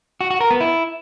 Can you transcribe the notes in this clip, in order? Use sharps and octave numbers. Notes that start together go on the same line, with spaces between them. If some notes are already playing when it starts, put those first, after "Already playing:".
F#4
F#4
A#4
B3
E4